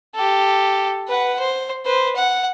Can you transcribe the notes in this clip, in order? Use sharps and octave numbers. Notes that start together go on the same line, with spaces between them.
G4 A4
B4 F#5
C5
B4 C5
F#5